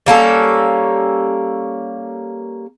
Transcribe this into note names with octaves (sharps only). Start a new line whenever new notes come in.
G3 A#3 C#4 A4